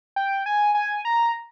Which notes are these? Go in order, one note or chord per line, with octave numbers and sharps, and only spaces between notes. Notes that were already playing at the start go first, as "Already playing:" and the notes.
G5
G#5
G#5
A#5